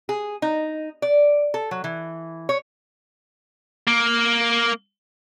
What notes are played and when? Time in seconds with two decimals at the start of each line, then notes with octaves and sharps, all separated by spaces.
0.09 G#4
0.42 D#4
1.02 D5
1.54 A4
1.71 F#3
1.84 E3
2.49 C#5
3.87 A#3